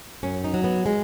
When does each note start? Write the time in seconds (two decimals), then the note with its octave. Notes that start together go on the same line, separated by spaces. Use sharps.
0.23 F#2 C#4
0.44 D#4
0.54 F#3
0.64 B3
0.86 G#3